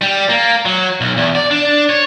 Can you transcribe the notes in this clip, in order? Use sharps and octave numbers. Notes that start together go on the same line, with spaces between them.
G3
A#3
F#3
B1
E2
D5
D4
C#5